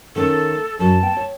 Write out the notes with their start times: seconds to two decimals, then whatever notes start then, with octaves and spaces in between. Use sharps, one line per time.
0.16 D#3 A3 C#4 A4
0.79 F#2 F#3 A5
1.01 B3 G5
1.17 C#5